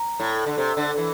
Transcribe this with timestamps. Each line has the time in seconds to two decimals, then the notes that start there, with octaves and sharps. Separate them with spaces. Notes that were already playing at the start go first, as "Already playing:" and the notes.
Already playing: A#5
0.20 A2
0.46 D3
0.58 C3
0.77 D3
0.97 E3